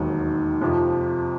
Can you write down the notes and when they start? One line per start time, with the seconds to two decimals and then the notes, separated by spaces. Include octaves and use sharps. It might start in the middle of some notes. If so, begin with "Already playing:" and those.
Already playing: E1 D#2 D#3 F#3
0.61 F2 C3 F3